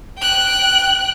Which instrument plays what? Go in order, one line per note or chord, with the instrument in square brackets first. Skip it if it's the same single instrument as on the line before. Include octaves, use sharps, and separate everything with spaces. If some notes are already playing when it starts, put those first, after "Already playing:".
[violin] G5 F#6